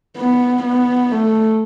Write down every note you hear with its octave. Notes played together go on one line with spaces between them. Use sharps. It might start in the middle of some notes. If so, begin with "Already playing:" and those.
B3
B3
A3